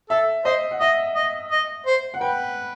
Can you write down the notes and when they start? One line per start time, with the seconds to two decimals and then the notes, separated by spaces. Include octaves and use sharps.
0.10 A4 E5
0.45 C5 D#5
0.71 F#5
0.80 D#5 E5
1.16 D#5
1.51 D#5
1.86 C5
2.14 F#5
2.21 B4 G5